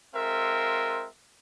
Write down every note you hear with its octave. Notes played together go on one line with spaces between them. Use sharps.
G#3 C4 F4 A#4 E5